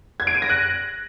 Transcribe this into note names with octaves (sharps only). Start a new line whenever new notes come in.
G#6
D7
D#7
A#6
F#6